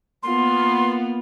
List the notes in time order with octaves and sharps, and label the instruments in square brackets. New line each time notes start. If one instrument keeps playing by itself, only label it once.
[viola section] A#3 B3 F4 [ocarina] C6